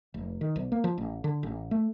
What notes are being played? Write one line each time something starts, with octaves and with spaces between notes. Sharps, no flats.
F1
D#3
B1
A#3
F3
A1
D3
A1
A3